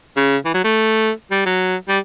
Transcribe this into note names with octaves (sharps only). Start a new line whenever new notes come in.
C#3
E3
F#3
A3
G3
F#3
G3